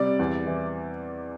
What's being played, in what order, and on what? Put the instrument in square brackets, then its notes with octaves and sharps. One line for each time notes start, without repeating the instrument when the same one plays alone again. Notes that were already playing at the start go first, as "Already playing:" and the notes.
Already playing: [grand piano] C3 G3 D5
E2
E3